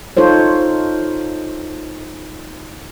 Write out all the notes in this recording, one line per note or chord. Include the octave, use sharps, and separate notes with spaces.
D#4 F4 A4 C5 C#5